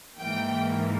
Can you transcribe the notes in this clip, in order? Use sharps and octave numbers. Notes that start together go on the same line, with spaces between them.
G#2 E3 A#3 G5